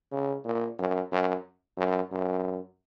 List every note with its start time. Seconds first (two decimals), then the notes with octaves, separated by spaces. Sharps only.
0.12 C#3
0.45 A#2
0.79 F#2
1.12 F#2
1.77 F#2
2.12 F#2